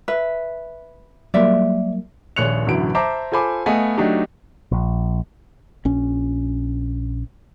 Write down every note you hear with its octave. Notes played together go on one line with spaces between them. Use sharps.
B4 E5
F#3 G3 A#3 D5 E5
D#1 A#1 C#5 F#6 C#7 F7
A1 F#2 B2 D3 E4 D7
C5 E5 A5 A#5 D6
F4 A4 C5 G#5 B5 D6
A3 B3 D#5 F5 G#5
F#3 A3 D4 D#4 G4
A#1
A#1 C#4